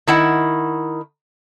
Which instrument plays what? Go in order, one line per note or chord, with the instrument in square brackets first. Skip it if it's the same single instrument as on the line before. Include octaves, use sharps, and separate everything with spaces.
[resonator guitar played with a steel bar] D#3 E4 F#5